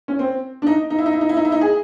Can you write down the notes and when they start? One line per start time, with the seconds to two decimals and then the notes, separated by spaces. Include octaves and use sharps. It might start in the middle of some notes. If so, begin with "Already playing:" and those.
0.08 C#4
0.19 C4
0.62 D4
0.67 D#4
0.90 D#4
0.99 E4
1.06 D#4
1.13 E4
1.21 D#4
1.29 E4
1.37 D#4
1.45 E4
1.52 D#4
1.61 G#4